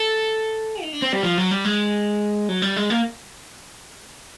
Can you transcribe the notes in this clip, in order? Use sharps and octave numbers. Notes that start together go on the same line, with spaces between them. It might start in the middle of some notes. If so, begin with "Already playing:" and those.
Already playing: A4
D#4
D4
C4
G3
F3
F#3
G3
G#3
F#3
G3
G#3
A#3